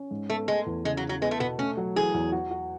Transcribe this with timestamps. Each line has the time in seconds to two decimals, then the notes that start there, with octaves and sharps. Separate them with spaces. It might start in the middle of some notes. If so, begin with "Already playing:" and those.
Already playing: C#4
0.11 G#2
0.29 A3 B3
0.47 G#3 A3
0.66 E2
0.84 C#3 G#3
0.97 F#3
1.04 E3
1.09 F#3
1.22 G#3 B3
1.31 A3
1.40 B2 B3
1.58 A3 C#4
1.77 F#3
1.96 E3 G#4
2.14 E2
2.32 F#4
2.51 F#4